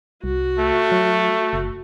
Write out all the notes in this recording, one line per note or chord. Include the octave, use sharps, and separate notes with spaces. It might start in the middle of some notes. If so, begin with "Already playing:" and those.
C2 F#4
A3
F#3
F#1